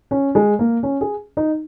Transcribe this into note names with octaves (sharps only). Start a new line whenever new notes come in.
C#4
G#3
A#3
C#4
G#4
D#4